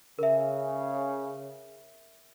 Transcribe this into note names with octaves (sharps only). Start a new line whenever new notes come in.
C#3 A#4 E5